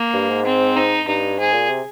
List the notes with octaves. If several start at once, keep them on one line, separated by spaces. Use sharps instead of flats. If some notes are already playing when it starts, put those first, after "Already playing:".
Already playing: A#3
G2
G#2
C4
D#4
G2 D#4
G#2 G#4
A#2
C3